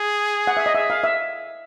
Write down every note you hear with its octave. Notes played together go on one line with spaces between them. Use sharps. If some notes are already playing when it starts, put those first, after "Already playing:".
Already playing: G#4
F#5
E5
D#5
G#4 E5
F5
E5